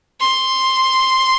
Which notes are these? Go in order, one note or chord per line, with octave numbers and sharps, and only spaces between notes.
C6